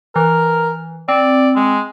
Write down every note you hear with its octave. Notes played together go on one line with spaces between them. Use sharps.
E3 A#4
C4 D5
G#3